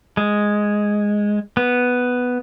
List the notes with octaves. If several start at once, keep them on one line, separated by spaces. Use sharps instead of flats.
G#3
B3